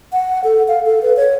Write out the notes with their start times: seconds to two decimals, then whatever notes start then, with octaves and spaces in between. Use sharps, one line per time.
0.13 F#5
0.44 A4
0.68 F5
0.86 A4
1.02 B4
1.17 C#5